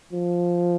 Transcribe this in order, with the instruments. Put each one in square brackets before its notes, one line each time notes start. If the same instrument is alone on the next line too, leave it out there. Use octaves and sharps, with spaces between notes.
[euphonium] F3